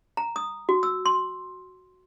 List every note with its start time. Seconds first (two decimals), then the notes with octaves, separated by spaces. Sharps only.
0.17 A#5
0.36 D#6
0.69 F#4
0.83 E6
1.06 C6